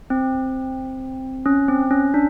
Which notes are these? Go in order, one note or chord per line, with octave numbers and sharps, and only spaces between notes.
C4
C#4
C4
C#4
D4